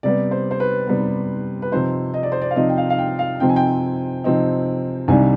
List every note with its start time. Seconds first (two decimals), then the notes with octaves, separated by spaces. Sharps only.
0.03 C3 G3 B3 D5
0.31 C5
0.51 C5
0.60 B4
0.87 C3 G3 B3
1.62 B4
1.72 C3 F3 C4 D#4 C5
2.14 D#5
2.23 D5
2.32 C5
2.42 D5
2.51 F5
2.56 C3 F3 C4 D#4 D#5
2.69 G5
2.78 F5
2.90 F5
2.98 G5
3.19 F5
3.40 C3 F3 C4 D#4 G5
3.49 G#5
3.56 G5
4.24 C3 F3 C4 D#4
5.08 C2 C3 D#3 G3 D4 G#5